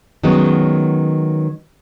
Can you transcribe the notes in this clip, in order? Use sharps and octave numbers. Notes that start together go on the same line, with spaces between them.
D#3 F#3 G#3 B3 C#4